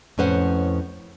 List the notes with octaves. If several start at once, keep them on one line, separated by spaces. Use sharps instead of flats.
F2 A2 C#4 B4 C5 F#5